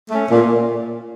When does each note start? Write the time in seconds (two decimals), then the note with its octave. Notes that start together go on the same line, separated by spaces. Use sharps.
0.11 A3 C#4
0.30 A#2